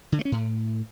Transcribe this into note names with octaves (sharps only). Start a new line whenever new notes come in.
D3
A3
C#4
A2